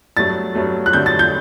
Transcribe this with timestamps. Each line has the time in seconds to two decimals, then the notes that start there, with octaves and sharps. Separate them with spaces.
0.17 G2 F#3 A3 A6
0.55 G2 F#3 A3
0.86 F#6
0.93 G2 D3 F#3 A3 G6
1.06 A6
1.19 G6